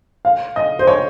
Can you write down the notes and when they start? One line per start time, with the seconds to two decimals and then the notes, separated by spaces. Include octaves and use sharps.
0.25 F5
0.56 D#5
0.79 C5
0.87 C#5